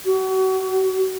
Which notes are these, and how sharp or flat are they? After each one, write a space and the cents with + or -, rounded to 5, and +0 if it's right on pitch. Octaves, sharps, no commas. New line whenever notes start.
F#4 +35